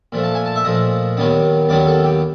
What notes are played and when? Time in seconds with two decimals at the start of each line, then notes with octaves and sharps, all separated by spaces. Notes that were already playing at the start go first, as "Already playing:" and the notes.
0.12 A#2 F3 A3
0.23 A5
0.35 G#5
0.46 A5
0.56 E5
0.65 A#2 F3 A3 D#5
1.17 D#2 D#3 F#3 B3 D4
1.69 D#2 D#3 F#3 B3 D4 D5
1.87 A4
2.04 G4